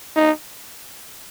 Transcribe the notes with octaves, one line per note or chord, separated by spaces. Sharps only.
D#4